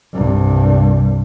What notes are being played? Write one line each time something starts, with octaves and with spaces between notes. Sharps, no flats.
C2 G2